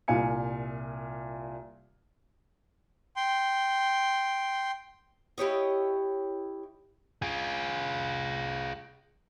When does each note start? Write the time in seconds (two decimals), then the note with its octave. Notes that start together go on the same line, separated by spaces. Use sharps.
0.08 C2 A#2 F5 G#5 C#7
3.16 G5 C6
5.38 E4 G4 C#5 D#5
7.22 F4 G#4